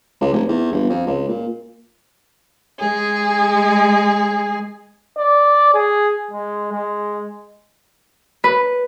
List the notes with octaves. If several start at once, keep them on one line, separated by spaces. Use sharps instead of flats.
C#2
F1
E2
G1
F2
C#2
A#2
G#3 G#4
D5
G#4
G#3
G#3
B4